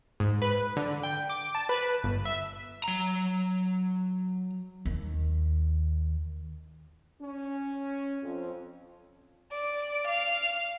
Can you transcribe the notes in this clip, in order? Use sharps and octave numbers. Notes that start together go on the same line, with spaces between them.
G#2
B4
D3
G5
D6
A5
B4
G1
E5
F#3 A#5
D#2
C#4
F2
D5
F5